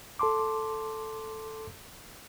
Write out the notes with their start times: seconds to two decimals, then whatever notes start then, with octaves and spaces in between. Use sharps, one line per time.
0.19 A4 A5 C6 D6